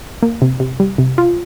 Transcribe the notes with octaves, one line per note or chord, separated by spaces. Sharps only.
A#3
C3
C3
G3
C3
F4